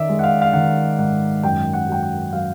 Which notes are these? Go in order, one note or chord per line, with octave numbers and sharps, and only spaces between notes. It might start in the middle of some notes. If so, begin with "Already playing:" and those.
Already playing: D#3 D5 E5
G#3
F#5
F5
F5
D#3 F#5
G#2 F#5
F#2 G5
F#5
F#3 G5
F#5
F#3 F5